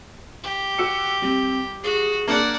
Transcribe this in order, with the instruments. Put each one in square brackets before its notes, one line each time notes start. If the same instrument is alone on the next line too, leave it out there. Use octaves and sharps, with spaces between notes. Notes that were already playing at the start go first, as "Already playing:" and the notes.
[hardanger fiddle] G4
[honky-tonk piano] F#4 E6 C#7
[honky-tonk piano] G3 [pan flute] C4
[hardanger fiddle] F#4 [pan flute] G#4
[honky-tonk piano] A#3 D4 [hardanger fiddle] D5 F#5